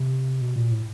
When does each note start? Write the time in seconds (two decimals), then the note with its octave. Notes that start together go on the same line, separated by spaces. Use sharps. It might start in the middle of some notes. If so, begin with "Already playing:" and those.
Already playing: C3
0.41 B2
0.56 A#2
0.72 A2